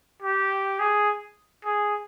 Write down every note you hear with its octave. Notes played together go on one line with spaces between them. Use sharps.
G4
G#4
G#4